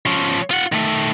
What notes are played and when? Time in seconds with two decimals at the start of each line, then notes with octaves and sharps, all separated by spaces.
0.06 F3 C#4
0.51 F4 F#5
0.72 D#3 A3